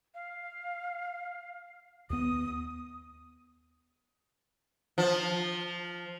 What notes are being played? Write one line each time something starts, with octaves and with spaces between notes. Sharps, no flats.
F5
D#2 B3 D#6
F3